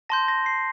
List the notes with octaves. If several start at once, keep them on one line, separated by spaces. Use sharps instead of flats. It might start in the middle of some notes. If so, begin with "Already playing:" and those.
A5 C6 G6 A#6
A#6
C7